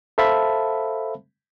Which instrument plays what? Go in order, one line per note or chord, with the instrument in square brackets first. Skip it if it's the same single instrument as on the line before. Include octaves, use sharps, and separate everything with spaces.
[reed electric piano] A4 C5 E5 F5 A5 B5